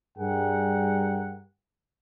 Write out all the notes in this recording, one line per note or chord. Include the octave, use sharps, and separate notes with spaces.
G2 G3 G#4 A#4 F#5 G5